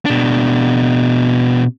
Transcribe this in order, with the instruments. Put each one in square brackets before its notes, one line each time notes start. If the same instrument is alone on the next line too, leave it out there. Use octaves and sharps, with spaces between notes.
[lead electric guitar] B2 D4